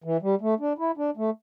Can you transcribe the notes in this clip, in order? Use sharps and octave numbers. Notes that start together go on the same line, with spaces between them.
E3
G3
A3
D4
E4
D4
A3